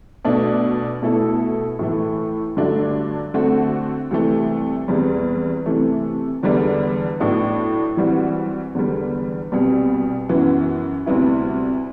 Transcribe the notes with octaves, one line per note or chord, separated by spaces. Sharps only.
B2 A3 D4
B2 A3 E4 A4
A2 E3 A3
G2 D3 F#3 A3 D4
D3 A3 C4 F#4
C2 C3 E3 A3
E2 C3 G3
C3 E3 A3
E2 D3 G3 B3 D4
A2 F#3 B3 D4
E3 G3 C4 F#4
E2 D3 G3
C2 B2 G3
F#2 E3 B3 F#4
D2 C3 G3 B3 E4